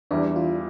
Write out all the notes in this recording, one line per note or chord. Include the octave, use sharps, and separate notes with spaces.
E2 E3 G3 D4
F4